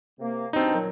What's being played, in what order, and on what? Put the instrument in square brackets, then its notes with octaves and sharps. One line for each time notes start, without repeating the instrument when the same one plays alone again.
[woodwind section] C3 A#3
[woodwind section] G2 B2 D4 [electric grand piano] C4 D#4
[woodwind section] A#2 D#3 F#3